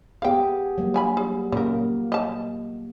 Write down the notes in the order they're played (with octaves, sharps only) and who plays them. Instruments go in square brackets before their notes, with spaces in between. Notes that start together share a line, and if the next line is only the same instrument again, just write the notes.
[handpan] B3 G4 G#4 [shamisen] F5 G5
[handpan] F#3 G3 A#3
[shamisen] D3 G#5 B5
G#4
[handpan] A#2 A#3 [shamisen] C#3 A#4
[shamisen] D#5 A5